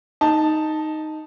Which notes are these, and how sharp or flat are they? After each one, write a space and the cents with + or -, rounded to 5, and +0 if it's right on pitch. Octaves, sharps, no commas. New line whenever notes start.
D#4 +0 A5 +0